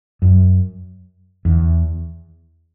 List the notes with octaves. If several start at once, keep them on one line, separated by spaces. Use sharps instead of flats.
F#2
E2